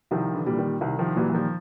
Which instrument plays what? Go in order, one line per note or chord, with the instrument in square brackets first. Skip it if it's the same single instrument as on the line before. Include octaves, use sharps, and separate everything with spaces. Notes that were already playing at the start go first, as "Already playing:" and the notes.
[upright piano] C2 [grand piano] D#3 F3
[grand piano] D3 E3
[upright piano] A#2 G3
[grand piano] D#3
[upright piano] C2 [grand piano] D#3
[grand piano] D#3 F3
[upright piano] A#2 G3 [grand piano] E3 F#3
[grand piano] E3
D#3 F3